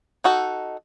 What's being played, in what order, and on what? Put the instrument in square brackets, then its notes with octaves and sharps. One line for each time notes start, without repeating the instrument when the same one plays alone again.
[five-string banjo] D#4 F#4 A4